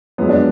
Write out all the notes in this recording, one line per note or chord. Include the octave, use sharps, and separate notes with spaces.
F#2 F3 G#3 B3
D4